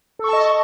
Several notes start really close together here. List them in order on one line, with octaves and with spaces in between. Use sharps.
A4 C#6 A5 D#5